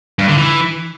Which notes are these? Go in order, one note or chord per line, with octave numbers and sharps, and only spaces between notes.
G2
D3
E3